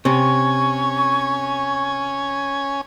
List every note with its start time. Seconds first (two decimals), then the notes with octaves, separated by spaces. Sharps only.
0.05 C3 C#4 G#5 C#6